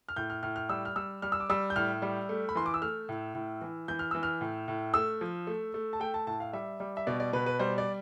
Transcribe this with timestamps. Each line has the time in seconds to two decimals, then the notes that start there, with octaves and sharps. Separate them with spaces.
0.09 F6
0.16 A2 G6
0.30 F6
0.43 A2 F6
0.56 F6
0.69 G3 E6
0.85 F6
0.96 G3 E6
1.22 G3 F6
1.32 E6
1.40 D6
1.49 G3 E6
1.70 G6
1.76 A2 F6
2.02 G3
2.29 A3
2.49 B5
2.55 E3 C6
2.66 D6
2.74 E6
2.82 A3 F6
3.09 A2
3.35 A2
3.61 E3
3.88 E3 G6
3.99 F6
4.11 E3 E6
4.23 F6
4.41 A2
4.68 A2
4.94 A3 E6
5.21 F3
5.47 A3
5.74 A3
5.93 A5
6.00 A3 G5
6.14 A5
6.27 A2 A5
6.40 F5
6.53 G3 E5
6.80 G3
6.97 E5
7.07 B2 D5
7.20 D5
7.33 B2 B4
7.46 B4
7.59 G3 C5
7.78 D5